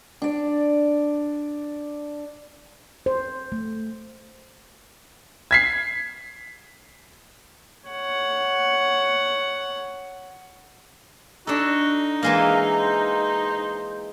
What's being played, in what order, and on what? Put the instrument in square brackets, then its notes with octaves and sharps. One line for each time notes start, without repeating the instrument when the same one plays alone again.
[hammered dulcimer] D4 D5
[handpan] C5
A3
[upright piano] G#6 B6 C7
[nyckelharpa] C#5 F#5
[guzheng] D4 A4 [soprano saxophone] D#4 [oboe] F#4
[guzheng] E3 G#3 A#3 [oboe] F5
[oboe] C5